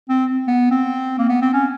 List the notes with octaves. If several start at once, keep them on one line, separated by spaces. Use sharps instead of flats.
C4
B3
C4
A#3
B3
C4
C#4